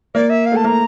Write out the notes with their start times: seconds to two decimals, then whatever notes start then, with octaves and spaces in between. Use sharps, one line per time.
0.15 A#3 D5
0.30 E5
0.46 F5
0.52 A3 A5
0.64 A#3 A#5